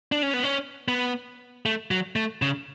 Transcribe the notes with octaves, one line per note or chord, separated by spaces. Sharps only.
D4
C#4
B3
C#4
B3
A3
F#3
A3
C#3